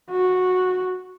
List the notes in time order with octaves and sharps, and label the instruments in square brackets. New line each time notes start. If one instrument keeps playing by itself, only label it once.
[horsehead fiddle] F#4